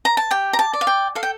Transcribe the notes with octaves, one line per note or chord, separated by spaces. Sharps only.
A#5
A5
G4 G5
A#5
A5
D5
F5
G5
A4 F5
G5